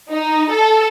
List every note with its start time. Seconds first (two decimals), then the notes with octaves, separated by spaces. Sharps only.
0.11 D#4
0.51 A4